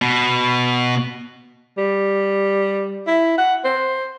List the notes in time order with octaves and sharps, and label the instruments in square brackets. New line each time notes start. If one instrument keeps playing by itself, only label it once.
[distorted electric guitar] B2
[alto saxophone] G3
E4
F#5
C5